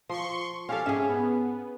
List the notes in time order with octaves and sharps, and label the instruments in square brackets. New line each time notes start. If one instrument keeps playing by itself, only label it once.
[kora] F3 [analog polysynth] C6 C#6
[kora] C#4 G4 A4 [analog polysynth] F5
[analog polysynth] G#2 C#4 [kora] G#4 E5
[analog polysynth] B3